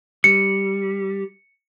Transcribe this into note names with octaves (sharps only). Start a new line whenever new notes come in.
G3 C#7